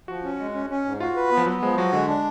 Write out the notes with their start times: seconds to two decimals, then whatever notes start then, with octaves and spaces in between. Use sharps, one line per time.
0.08 F3 F#4
0.24 C#4
0.39 G#3
0.54 C#4
0.70 C#4
0.85 G#2
1.00 F4 F#4
1.16 B4
1.31 B3
1.37 F3
1.46 F#3 B3
1.62 F3 G#3
1.77 F#3 F#4
1.93 D3 G#3
2.08 D4